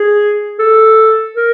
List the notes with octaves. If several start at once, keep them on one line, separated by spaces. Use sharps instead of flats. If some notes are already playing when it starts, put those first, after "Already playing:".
Already playing: G#4
A4
A#4